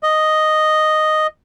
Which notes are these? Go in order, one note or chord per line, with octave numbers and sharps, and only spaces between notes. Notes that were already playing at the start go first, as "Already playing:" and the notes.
D#5